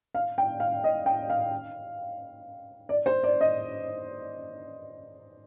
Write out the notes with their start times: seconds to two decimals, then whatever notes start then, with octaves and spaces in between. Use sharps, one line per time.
0.15 F5
0.38 G5
0.60 F5
0.84 D#5
1.06 G5
1.30 F5
2.89 D5
3.06 C5
3.24 D5
3.41 D#5